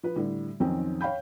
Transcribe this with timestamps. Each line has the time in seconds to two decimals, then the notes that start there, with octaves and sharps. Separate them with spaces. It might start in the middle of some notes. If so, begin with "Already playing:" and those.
0.03 F3 B4
0.16 A2 D3 G3
0.60 B1 F2 D#3 C4 C#4 G5
1.01 C#5 F5 G5 B5 G6